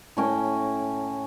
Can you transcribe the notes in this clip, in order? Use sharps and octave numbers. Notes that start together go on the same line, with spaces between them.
A2 C#4 G5